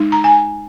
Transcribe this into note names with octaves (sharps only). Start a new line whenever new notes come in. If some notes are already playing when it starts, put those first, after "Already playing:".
Already playing: G#3 D#4
A#5
G#5